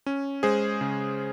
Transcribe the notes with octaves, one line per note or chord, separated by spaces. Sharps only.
C#4
G#3 G#4 C5
C#3